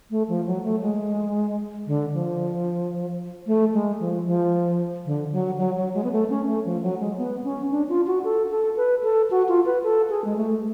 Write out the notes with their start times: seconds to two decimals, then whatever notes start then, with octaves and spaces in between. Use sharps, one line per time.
0.10 A3
0.29 F3
0.46 F#3
0.64 A3
0.81 G#3
1.87 D3
2.14 F3
3.47 A3
3.73 G#3
4.00 F3
4.26 F3
5.06 D3
5.32 F#3
5.58 F#3
5.77 F#3
5.94 G#3
6.04 B3
6.12 A3
6.30 C#4
6.47 A3
6.65 F3
6.83 F#3
7.00 G#3
7.18 B3
7.44 C#4
7.71 D4
7.89 F4
8.07 F#4
8.24 A4
8.51 A4
8.77 B4
9.03 A4
9.31 F#4
9.48 F4
9.66 B4
9.83 A4
10.10 G#4
10.25 G#3
10.37 A3